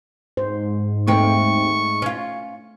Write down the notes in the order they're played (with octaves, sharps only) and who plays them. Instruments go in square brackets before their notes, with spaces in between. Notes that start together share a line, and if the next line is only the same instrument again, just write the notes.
[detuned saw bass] G#2 [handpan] C5
[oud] D#2 C4 [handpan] A3 [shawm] C#6
[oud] C#4 F4